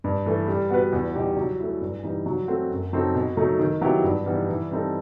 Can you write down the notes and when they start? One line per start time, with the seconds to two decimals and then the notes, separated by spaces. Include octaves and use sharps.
0.04 G2
0.26 E3 A3
0.48 G3
0.70 B3 F#4 B4
0.93 E2
1.15 B2 G3 D#4 G4
1.37 F#3
1.60 A3 E4
1.81 G2
2.04 E3 G3 D#4
2.26 F#3
2.48 A3 C4 F#4
2.71 F#2
2.93 F#3 C4 D#4 A4
3.15 B2
3.37 F#3 A3 D#4
3.59 D#3
3.81 F#3 B3 E4 G4
4.04 G2
4.26 E3 G3 B3 D#4
4.48 E3
4.71 G3 C4 D#4 A4